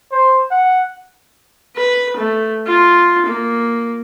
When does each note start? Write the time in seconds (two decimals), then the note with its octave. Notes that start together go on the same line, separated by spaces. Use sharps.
0.12 C5
0.51 F#5
1.76 B4
2.17 A3
2.66 F4
3.26 A#3